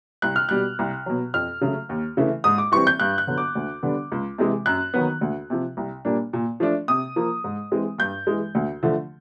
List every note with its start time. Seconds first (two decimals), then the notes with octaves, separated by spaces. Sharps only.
0.22 C2 F#6
0.36 F6
0.49 B2 G3 F#6
0.79 C2
1.06 B2 F#3
1.34 F2 F6
1.61 C#3 F#3 A3
1.89 D#2
2.17 C#3 E3 A3
2.44 G#2 D#6
2.58 D6
2.72 E3 G3 C4 C#6
2.87 G6
3.00 G2 F#6
3.18 F#6
3.27 D3 F#3 B3
3.38 D6
3.55 D2
3.83 D3 G3 B3 D4
4.12 C#2
4.38 C3 E3 G#3
4.66 F#2 F#6
4.94 D#3 F#3 B3
5.21 D2
5.50 C3 F3
5.77 C2
6.05 A#2 G3 A#3 D4
6.33 A#2
6.60 F3 A3 D4
6.88 C3 D#6
7.16 F3 A#3
7.44 G#2
7.71 E3 G#3 C4
7.98 G2 G6
8.27 E3 G#3
8.55 D2
8.83 D3 F3 A3